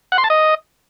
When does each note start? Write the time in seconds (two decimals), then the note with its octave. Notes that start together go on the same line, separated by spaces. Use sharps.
0.12 F#5
0.18 C6
0.24 A5
0.30 D#5